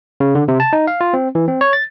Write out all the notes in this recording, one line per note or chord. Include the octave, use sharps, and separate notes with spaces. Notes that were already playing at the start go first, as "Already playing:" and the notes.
C#3
D3
C3
A5
D#4
F5
F4
C4
E3
C4
C#5
A6